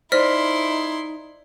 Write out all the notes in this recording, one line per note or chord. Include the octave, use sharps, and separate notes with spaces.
D#4 E4 C5 D5 C6 F6 B6